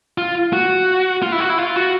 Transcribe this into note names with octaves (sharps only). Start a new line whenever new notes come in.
F4
F#4
F4
E4
F#4
E4
F4
F#4